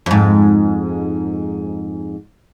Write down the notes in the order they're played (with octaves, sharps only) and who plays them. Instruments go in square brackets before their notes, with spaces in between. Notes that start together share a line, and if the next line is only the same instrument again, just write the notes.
[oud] F2 G#2